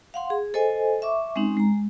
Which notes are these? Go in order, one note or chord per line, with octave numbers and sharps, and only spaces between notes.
F5 F#5 C6
G#4
A4 C5 D#5 G#5
E5 C#6 D6
G#3 C4 C#4 D#4
G#3 A#5